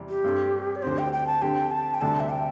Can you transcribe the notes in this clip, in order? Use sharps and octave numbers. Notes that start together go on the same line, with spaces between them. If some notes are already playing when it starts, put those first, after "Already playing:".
Already playing: E2 C3 G3
G4
G2 G3 C4 A4
D5
D2 D3 C4 G4 C5
G5
G5
A5
D3 C4 G4 G5
A5
G5
D2 C3 G3 D4 A4 A5
E5
G5